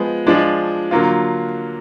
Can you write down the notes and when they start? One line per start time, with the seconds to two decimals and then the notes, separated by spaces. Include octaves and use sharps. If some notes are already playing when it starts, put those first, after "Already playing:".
Already playing: F3 G#3 B3
0.27 F3 G#3 D4
0.91 D3 F#3 A#3 F4